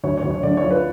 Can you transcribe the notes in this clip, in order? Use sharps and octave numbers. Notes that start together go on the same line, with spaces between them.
D2 C#5
C#5
D2
C#5
D3 D5
C#5
F3
B4